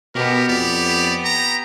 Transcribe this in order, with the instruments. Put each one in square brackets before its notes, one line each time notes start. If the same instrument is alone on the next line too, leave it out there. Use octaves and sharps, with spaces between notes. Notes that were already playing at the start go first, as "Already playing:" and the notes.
[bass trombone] B2 [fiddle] B3 G4 [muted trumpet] A#4
[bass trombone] F2 [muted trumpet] D5
[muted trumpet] A#5